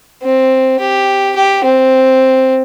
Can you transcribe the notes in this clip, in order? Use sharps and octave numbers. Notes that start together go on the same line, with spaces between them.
C4
G4
G4
C4